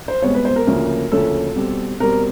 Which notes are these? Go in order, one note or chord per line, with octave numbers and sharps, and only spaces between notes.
C5
C2 B2 G#3 B3 C#5
B4
C5
A#4
D2 C#3 F3 A#3 C#4
D2 C#3 F3 A#3 C#4 A4
B2 G3 C4
B2 G3 C4 A#4